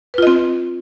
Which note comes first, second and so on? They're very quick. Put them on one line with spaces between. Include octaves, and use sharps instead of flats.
B4 F4 D#5 C4